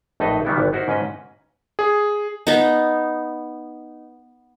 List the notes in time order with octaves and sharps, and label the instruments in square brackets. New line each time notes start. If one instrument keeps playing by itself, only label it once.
[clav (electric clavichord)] A#1 A2 D#4 A4 B4 D#5
D#3 E3 G3 B3 D#4 E4
G#1 B3
D#4 E4 F#4 A#4 C5
G#2 C#4 B4 D#5
[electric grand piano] G#4
[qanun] B3 D#4